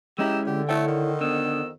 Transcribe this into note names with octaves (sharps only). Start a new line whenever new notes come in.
G#3 C#4 E4 G4 D#5 A#5 E6
D3 G4
A3 E4 C#5 G5
D#3
F2 D3 B3 E6